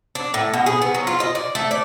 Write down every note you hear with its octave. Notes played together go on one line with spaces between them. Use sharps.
D4
A2
B2
G#4
B3
F#3
F4
D#5
D5
A3
D5